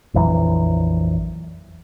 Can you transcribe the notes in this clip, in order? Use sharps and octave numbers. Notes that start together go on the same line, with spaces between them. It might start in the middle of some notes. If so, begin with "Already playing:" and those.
A#1 F2 E3 F#3